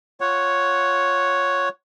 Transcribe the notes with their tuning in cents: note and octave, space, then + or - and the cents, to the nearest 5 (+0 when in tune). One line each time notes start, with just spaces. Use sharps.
F4 +0 C#5 +0 F#5 +0